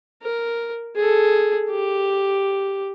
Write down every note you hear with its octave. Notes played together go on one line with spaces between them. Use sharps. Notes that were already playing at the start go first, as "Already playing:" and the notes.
A#4
G#4 A4
G4